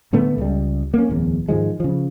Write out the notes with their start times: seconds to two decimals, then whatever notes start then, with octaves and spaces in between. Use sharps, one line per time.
0.13 A2 D3 A3 B3
0.38 C#2 G3
0.94 A#3 C#4
1.09 D1 E2
1.49 G#2 D#3 F3 G#3
1.80 C#3 F3